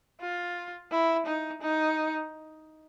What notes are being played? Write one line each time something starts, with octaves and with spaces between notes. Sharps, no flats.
F4
E4
D#4
D#4